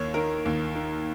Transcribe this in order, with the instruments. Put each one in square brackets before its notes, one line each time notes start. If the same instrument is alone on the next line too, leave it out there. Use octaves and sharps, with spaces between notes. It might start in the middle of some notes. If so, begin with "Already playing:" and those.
Already playing: [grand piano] D#2 D#3 C#5
D#3 A#4
D#2
D#3